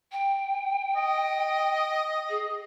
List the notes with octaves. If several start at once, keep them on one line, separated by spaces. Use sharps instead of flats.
G5
D#5
G#4